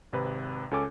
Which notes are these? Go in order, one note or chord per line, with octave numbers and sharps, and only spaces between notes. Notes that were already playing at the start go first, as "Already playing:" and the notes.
G#1 C3 B4 B5
C#2 C#4 A4 G#5 D6